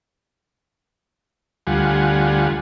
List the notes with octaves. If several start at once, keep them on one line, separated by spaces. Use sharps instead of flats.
D2 G3 F4 F#5 G#5